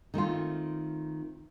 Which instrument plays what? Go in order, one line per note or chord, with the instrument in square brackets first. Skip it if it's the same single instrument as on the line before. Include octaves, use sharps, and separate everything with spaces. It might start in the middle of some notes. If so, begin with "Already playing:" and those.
[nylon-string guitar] D#3 A3 C4 F4